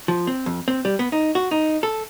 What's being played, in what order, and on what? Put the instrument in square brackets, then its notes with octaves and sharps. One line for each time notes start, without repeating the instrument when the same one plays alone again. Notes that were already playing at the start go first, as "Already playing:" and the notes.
[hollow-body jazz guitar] F3
C4
F2
C4
G3
B3
D#4
F#4
D#4
A4